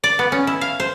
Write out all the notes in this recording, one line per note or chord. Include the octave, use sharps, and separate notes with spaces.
D5
B3
C#4
E4
F5
C5